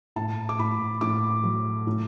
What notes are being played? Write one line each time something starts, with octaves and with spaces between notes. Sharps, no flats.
A2 A5
D6
A2 B5
A2 D6
F#3
A2